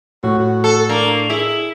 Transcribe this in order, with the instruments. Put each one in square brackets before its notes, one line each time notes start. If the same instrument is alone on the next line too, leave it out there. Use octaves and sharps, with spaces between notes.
[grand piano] A2 [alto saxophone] F#4
[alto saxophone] F#4
[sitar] A4
[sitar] A#3 [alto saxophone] D4
[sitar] E4 [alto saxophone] G#4